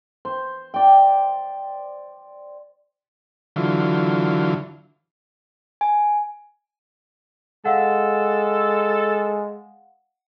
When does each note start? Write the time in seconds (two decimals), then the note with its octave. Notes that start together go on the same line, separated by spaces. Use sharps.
0.25 C5
0.74 D5 G5
3.56 D3 E3 F#3 F4
5.81 G#5
7.65 G#3 A4 F5 F#5